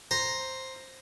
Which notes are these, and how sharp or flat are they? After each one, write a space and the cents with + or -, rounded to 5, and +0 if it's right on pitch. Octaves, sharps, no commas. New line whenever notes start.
C5 +5 A#5 +0